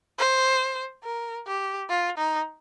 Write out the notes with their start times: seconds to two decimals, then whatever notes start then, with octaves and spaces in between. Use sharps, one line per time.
0.18 C5
1.03 A#4
1.47 G4
1.89 F4
2.17 D#4